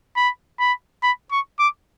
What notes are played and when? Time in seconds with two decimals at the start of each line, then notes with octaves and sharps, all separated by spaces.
0.16 B5
0.59 B5
1.03 B5
1.31 C#6
1.59 D6